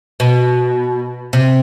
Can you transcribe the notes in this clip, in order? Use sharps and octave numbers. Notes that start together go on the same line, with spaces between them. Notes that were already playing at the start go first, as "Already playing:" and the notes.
B2
C3